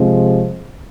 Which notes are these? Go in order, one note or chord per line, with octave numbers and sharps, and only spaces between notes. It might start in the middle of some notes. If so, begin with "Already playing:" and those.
Already playing: C3 F3 G#3